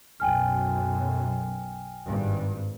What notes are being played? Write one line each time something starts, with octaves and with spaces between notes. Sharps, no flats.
B1 F#2 G5 G#5 F6
G#1 G2